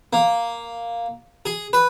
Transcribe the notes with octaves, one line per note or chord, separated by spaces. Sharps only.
A#3
G#4
B4